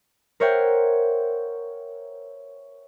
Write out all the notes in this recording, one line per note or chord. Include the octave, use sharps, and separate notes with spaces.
A#4 C5 C#5 E5 F#5 G5